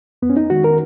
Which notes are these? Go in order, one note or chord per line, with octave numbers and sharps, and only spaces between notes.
F2 B3
C#4
D#4
D#3 G#3 F#4
A#4